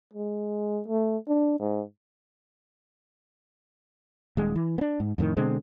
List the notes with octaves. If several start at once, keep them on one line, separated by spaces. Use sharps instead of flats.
G#3
A3
D4
G#2
D#1 G#3
E3
B3 D4
G#2
F2 A2 D3 D#3
B2 D3 G#3 C4